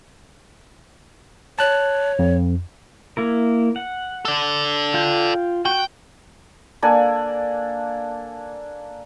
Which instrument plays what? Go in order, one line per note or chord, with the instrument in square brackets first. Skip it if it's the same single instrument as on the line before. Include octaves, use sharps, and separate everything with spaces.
[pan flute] C#5 [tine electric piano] A5 F#6
[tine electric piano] F2
[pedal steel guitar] A#3 E4 A#4
F#5
[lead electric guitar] A4 D5
[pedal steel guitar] F4 G5
[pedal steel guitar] F#4 F#5 [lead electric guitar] G5
[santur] A#3 D4 A4 G#5